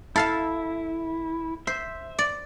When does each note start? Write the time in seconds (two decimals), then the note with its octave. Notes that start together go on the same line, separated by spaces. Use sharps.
0.16 E4 A4 F5 A5
1.67 C5 E5
2.19 D5